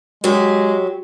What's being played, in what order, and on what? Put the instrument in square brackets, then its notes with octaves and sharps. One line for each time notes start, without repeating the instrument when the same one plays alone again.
[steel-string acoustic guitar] F#3 G4 [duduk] G#3